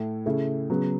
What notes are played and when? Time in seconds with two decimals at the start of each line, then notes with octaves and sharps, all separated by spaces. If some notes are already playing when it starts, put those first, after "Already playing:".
Already playing: A2 A3 E4
0.26 C#3 A3 E4
0.70 C#3 F#3 B3